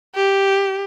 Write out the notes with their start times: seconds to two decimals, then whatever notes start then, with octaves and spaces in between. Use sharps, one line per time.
0.16 G4